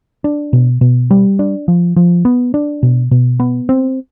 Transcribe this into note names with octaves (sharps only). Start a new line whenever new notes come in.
D4
B2
B2
G3
D4
F3
F3
B3
D4
B2
B2
B3
C4